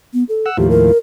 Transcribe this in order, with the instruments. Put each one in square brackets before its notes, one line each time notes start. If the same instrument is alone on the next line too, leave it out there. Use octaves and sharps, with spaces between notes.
[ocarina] B3
A4
[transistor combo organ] F#5 E6
[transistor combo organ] D#2 A2 F3 [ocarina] G4
[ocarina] A#4